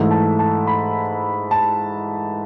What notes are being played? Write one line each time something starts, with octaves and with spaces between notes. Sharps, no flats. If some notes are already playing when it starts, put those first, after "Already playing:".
Already playing: G#2 E3 A3 E4
A5
A5
B5
A5